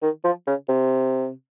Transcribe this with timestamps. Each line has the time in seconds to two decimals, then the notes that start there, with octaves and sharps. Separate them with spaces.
0.02 D#3
0.24 F3
0.47 C#3
0.69 C3